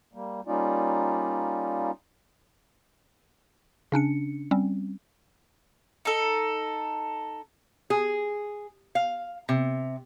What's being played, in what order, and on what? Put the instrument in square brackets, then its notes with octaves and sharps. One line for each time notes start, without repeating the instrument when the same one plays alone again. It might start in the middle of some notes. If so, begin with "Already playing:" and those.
[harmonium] G3 A#3
G3 A#3 C#4 D#4 F4 D5
[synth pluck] C#3 C#4 D4 C#7
G3 C4 C#4
[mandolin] D#4 A4
[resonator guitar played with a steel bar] G#4
F5
C3